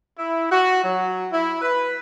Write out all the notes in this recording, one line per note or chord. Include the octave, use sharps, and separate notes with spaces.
E4
F#4
F#3
E4
B4